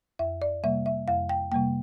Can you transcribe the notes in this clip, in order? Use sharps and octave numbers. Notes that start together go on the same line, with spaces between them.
F2 E5
D5
C3 G3 A#3 E5
E5
F2 F5
G5
C3 G3 A#3 G5